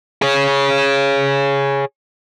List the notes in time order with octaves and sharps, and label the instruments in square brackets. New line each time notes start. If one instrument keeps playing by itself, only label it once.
[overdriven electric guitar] G#4 C#5